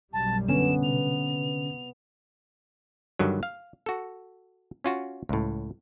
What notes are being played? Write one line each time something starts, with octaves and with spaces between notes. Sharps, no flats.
B1 F#2 G3 A5
D3 B3 C#4 E7
C3 F7
G2 D3 D#3 F#3
F5
F#4 A4
C#4 F4 F#4
C#2 A2